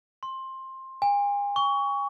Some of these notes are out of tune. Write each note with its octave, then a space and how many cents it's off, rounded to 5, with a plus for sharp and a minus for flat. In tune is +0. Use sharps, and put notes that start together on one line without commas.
C6 +15
G#5 -40
C#6 +20